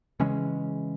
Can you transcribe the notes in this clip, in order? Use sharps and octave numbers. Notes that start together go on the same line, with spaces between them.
C#3 E3 G#3 C#4